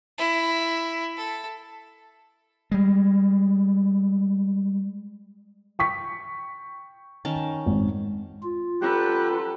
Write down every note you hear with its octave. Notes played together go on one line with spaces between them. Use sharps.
E4
A4
G3 G#3
G5 C#6 B6
D#3 C#4 A5
G#1
F4
F#3 C#4 G4 A4 B4 G5 F#6